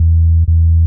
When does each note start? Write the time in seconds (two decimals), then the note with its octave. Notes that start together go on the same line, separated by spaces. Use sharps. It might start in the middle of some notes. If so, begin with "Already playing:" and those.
Already playing: E2
0.48 E2